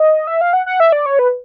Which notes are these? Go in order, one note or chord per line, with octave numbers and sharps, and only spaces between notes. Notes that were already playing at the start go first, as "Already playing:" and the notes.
Already playing: D#5
E5
F5
F#5
F#5
E5
D5
C#5
B4